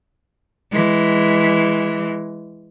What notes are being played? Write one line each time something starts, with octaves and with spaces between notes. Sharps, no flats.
E3 G#3